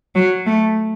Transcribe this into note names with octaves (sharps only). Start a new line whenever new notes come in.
F#3
A3